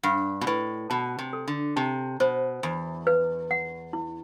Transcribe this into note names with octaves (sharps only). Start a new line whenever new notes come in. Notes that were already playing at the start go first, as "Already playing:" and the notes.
G2 F#5
B2
A2 B4
B2 A5
C3
A4
D3
C3 A5
B2 C5
E2 B5
B4
F#5
E4